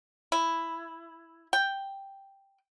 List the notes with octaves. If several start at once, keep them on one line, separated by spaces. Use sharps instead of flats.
E4
G5